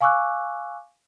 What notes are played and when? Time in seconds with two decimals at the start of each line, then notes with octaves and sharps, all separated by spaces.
0.01 F5 G#5 C#6 D6 E6 F#6